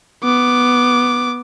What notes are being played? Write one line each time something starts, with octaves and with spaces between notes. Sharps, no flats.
B3 D6